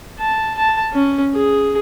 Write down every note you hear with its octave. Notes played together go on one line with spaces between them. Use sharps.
A5
A5
C#4
G#4